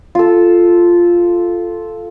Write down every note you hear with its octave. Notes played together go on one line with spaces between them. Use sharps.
F4 A4